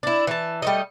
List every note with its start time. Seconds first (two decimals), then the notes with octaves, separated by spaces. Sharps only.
0.03 D4 E4
0.27 E3 A5
0.62 G3 A3 D#5